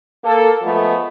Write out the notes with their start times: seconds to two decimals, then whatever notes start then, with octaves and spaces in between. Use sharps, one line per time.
0.24 A#3 A4
0.63 F3 G#3 A3 B3